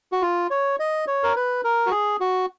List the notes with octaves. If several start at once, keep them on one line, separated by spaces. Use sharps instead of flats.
F#4
F4
C#5
D#5
C#5
A#4
B4
A#4
F#4
G#4
F#4